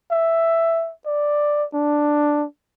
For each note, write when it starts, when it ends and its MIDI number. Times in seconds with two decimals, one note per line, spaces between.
0.12 0.92 76
1.06 1.65 74
1.74 2.45 62